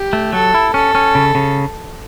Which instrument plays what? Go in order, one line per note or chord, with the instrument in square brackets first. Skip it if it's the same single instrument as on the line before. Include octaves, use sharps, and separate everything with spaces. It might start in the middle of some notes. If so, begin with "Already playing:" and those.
Already playing: [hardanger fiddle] G4
[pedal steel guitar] A3
[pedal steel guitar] F#3 [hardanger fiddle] A4
[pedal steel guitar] E4
[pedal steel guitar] C#4 [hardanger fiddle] A4
[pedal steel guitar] C#4
C#3
C#3